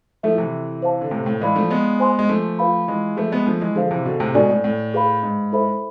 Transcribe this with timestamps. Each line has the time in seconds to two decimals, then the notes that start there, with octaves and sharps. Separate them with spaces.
0.23 F3 A3 E4 A4 E5
0.38 C3 E3
0.82 C5 F5 A5
1.01 D3
1.11 A2 C3
1.26 A2
1.41 E3 G#3 E4 B4 D5 F5 B5
1.56 F3 A3
1.70 G#3 B3
2.00 C5 G#5 C6
2.19 G#3
2.29 F3 A3
2.59 F4 B4 F5 B5
2.88 E3 G#3
3.17 F3 A3 G#4 B4 E5
3.32 G#3 B3
3.46 F3 A3
3.61 E3 G#3
3.76 D3 F3 G#4 C5 F5
3.91 C3 E3
4.05 B2 D3
4.20 A2 C3
4.35 G#2 B2 D4 A4 D5 G#5
4.50 A2
4.64 A2
4.94 G#4 B4 F5 B5
5.23 G#2
5.52 E4 A4 C5 E5 B5